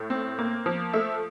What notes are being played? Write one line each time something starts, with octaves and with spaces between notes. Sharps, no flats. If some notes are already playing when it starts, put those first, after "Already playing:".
Already playing: A2
C4
A#3
F3
A3 E5